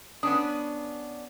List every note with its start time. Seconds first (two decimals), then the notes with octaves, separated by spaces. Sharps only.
0.23 B3 C#4 D4 D#6